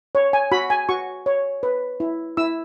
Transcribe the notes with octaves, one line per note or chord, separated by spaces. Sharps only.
C#5
G#5
F#4 B5
G#5
F#4 C#6
C#5
B4
E4
E4 E6